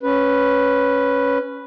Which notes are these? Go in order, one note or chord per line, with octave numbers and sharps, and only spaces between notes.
C#4 B4